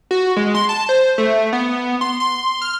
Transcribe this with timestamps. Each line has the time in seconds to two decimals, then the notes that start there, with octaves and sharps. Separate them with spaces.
0.11 F#4
0.37 G#3
0.55 C6
0.69 A5
0.89 C5
1.18 A3
1.53 B3
2.01 C6
2.20 C6
2.62 F6